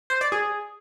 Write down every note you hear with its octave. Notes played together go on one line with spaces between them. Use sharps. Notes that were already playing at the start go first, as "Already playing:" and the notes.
C5
D5
G#4